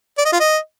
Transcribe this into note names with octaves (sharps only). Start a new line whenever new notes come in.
D5
D#5
F4
D#5